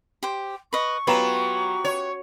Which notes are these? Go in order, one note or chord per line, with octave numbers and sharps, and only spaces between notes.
G4 C5
B4 D#5 C#6
F#3 B3 F4 G4 B4 A#5 E7
C#5